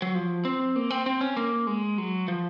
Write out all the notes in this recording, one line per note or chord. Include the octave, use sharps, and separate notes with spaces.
F#3
F3
C4
A#3
C4
C4
C#4
A#3
G#3
F#3
F3